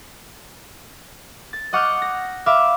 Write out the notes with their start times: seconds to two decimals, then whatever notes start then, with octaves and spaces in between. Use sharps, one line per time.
1.53 A6
1.73 D#5 F#5 C#6 D6 F6 G6
2.02 A#6
2.46 E5 F5 B5 D6 F6